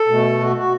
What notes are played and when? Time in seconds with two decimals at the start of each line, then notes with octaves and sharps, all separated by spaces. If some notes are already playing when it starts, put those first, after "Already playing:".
Already playing: A4
0.08 B2 A3
0.41 F#4
0.56 F#4